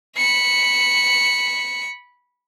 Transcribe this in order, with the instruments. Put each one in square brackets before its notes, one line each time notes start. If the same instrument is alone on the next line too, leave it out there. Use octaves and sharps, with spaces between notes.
[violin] B5 C#7